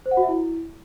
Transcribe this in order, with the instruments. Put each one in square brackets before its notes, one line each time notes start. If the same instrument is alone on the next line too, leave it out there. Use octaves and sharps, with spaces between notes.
[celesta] C5
F#5
F#4
E5
E4